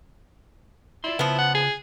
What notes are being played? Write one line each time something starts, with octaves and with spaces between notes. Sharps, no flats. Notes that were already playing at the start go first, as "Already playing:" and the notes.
E4 F4 D5 C6
C#3 F3 B3 F4
F#5
G#4